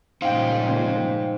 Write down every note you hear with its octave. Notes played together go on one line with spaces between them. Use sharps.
A#2 C#3 F3 D#4 C5 F5 G5